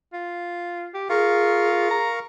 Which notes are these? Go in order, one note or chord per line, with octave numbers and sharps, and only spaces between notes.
F4
G4
F4 G#4 A#4 F5 C#6
A#5